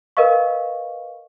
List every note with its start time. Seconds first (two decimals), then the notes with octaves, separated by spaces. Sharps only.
0.17 A#4 B4 D#5 F5 C#6